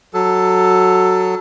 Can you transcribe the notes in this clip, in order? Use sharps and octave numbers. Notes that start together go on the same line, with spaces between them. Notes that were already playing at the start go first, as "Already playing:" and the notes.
F#3 A4